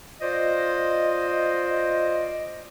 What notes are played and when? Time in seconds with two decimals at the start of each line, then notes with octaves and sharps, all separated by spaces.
0.21 F4 C5 D5 D#5